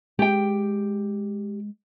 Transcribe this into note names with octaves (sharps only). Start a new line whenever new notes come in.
G#3 G4 G5